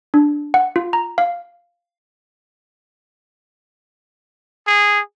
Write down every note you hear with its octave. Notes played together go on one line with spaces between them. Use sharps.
D4
F#5
F4
A#5
F5
G#4